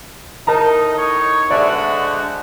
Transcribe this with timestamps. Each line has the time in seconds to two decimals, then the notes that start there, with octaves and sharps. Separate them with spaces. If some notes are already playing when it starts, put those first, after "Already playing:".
0.47 A2 D#4 A#4 D#5 A5 A#5
0.98 C#5
1.51 D3 G#3 F#4 C5 D5 E5